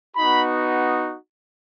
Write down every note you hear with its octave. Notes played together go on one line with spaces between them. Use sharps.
B3 D#4 F#4 B5